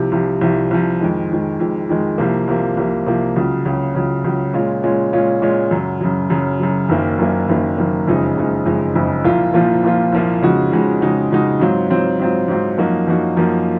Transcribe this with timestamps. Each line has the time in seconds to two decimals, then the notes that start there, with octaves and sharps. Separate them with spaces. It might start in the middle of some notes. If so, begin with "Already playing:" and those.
Already playing: C2 C3 F3
0.12 C2 C3 F3
0.41 C2 C3 F3
0.71 C2 C3 F3
1.00 F2 D#3 G#3
1.30 F2 D#3 G#3
1.60 F2 D#3 G#3
1.89 F2 D#3 G#3
2.18 C2 C3 F3 A#3
2.48 C2 C3 F3 A#3
2.77 C2 C3 F3 A#3
3.06 C2 C3 F3 A#3
3.36 C#2 C#3 F#3
3.65 C#2 C#3 F#3
3.95 C#2 C#3 F#3
4.24 C#2 C#3 F#3
4.54 A#2 G#3 C#4 F4
4.84 A#2 G#3 C#4 F4
5.13 A#2 G#3 C#4 F4
5.42 A#2 G#3 C#4 F4
5.71 F#2 C#3 F#3
6.01 F#2 C#3 F#3
6.30 F#2 C#3 F#3
6.60 F#2 C#3 F#3
6.89 F#1 F#2 D#3 A#3
7.19 F#1 F#2 D#3 A#3
7.48 F#1 F#2 D#3 A#3
7.77 F#1 F#2 D#3 A#3
8.07 F#1 F2 C#3 G#3 D#4
8.37 F#1 F2 C#3 G#3 D#4
8.65 F#1 F2 C#3 G#3 D#4
8.95 F#1 F2 C#3 G#3 D#4
9.25 C2 A#2 F3 A#3 F4
9.54 C2 A#2 F3 A#3 F4
9.83 C2 A#2 F3 A#3 F4
10.13 C2 A#2 F3 A#3 F4
10.42 F2 C#3 G#3 D#4 F#4
10.72 F2 C#3 G#3 D#4 F#4
11.01 F2 C#3 G#3 D#4 F#4
11.30 F2 C#3 G#3 D#4 F#4
11.60 G#2 F#3 C4 F4
11.90 G#2 F#3 C4 F4
12.19 G#2 F#3 C4 F4
12.48 G#2 F#3 C4 F4
12.78 F#2 F3 A#3 D#4 F#4
13.07 F#2 F3 A#3 D#4 F#4
13.37 F#2 F3 A#3 D#4 F#4